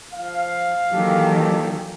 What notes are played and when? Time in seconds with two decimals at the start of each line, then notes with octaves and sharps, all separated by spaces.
0.13 F3 F5
0.92 D#3 E3 F#3 A#3 G4 A4